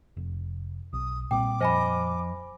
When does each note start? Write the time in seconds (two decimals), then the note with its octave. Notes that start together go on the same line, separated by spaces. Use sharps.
0.17 F1
0.93 B1 D#6
1.31 A#2 G3 C4 G5 D6
1.61 F2 C5 D#5 G#5 B5